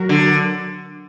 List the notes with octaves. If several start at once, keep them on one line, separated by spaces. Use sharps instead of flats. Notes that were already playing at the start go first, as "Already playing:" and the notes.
Already playing: F#3 F#4 A#4
D3